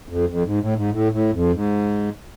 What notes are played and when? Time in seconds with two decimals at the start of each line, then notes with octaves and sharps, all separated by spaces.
0.09 F2
0.29 F2
0.45 G#2
0.60 A2
0.76 G#2
0.92 A2
1.12 A2
1.33 F2
1.53 G#2